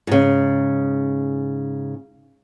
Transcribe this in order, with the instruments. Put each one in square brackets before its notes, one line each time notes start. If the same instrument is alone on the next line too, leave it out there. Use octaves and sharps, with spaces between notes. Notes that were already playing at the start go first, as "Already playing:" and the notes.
[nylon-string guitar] G#2 C#3